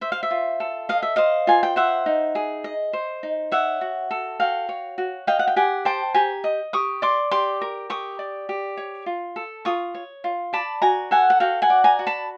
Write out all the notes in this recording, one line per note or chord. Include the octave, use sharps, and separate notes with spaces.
C5 E5
F5
E5
F4
A4
D#5 F5
E5
C5 D#5 F5
F4 G#5
G5
C5 E5 F#5
D#4
G#4
D#5
C5
D#4
C#5 E5 F#5
F#4
A4
F#4 F5 G5
C#5
F#4
D#5 F5 G5
F#5
G5
G4 F#5 G#5
C5 G5 A5
G4 G#5 A#5
D#5
G4 C#6 D#6
D5 C6 D6
G4 C6 D6
A#4
G4 C#6 D#6
D5
G4
C#5
F4
A4
F4 C#6 D#6
C#5
F4
D5 A5 B5
F#4 G#5 A#5
A4 F#5 G#5
F#5
F#4 F5 G5
F#5 G#5
D5
G#5 A#5
F#4
A5 B5